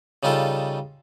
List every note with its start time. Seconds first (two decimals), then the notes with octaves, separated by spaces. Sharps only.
0.23 C#3 G3 D#4 F4 A4